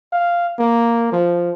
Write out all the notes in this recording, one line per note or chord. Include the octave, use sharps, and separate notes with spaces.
F5
A#3
F3